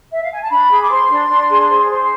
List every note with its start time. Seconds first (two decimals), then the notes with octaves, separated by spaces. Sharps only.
0.12 E5
0.22 F5
0.32 G#5
0.41 A5
0.49 D4 B5
0.70 G#4
0.80 D6
0.89 C5 C6
1.10 D4
1.29 D4
1.50 G#4
1.69 C5
1.89 C5